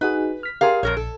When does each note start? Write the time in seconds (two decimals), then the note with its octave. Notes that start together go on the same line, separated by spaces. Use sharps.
0.01 D#4 F#4 G#4 B4
0.43 F6 B6
0.61 G4 G#4 A#4 D5 F5 C6
0.83 A#1 F2 A#4 C#5
0.97 A4